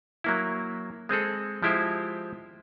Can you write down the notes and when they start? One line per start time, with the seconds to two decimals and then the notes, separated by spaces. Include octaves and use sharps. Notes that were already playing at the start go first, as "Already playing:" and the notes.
0.24 F#3 A#3 E4
1.09 G#3 C4 G#4 A4
1.63 F3 G#3 E4 G4 C5